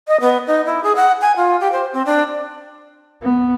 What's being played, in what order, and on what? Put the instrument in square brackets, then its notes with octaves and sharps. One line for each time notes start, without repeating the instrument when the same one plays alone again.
[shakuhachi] D#5
B3
D#4
E4
G#4
F#5
G#5
F4
G4
C5
C4
D4
[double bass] B3